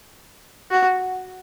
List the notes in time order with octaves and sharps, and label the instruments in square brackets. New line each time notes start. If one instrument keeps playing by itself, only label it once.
[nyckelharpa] F#4